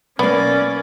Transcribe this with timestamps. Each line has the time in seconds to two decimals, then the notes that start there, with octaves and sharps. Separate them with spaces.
0.19 B1 A#3 B3 C#4 D5